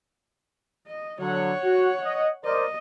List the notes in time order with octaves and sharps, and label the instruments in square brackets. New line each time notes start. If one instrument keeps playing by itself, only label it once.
[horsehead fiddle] D#5
[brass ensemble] D3 F#3 [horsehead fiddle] C#5 F#5
[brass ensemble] F#4
D#5
[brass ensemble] A#4 C5 D5 [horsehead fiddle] D#5